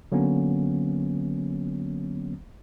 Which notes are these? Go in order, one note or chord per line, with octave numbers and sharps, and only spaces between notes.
D3 F#3 A#3 B3 C#4